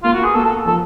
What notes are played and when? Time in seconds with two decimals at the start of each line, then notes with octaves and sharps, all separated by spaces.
0.03 A#3 F4
0.13 F#4
0.20 B3 G#4
0.34 A#3 A4
0.45 A4
0.65 F3 A4